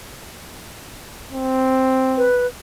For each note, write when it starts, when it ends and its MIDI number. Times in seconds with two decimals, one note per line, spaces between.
1.32 2.30 60
2.17 2.47 71